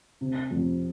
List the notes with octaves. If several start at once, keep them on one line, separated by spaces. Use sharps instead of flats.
C3
F2